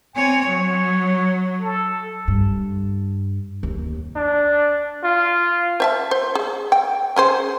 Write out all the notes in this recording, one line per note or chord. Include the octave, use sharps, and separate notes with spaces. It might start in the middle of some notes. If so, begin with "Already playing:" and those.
C4 C#5 G#5
F#3 C#5
A4
G2
D#2
D4
F4
C5 E5 A5
C5
G#4
G5
C#4 G#4 C5